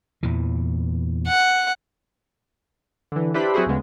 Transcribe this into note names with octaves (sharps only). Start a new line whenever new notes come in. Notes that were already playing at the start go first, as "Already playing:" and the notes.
E2 A#2 E3
F#5
D3 E3
D4 E4 G4 B4 C5 B5
F#3 C4 E4 F#4 G#4 C5
D2 C#3 G#3 B3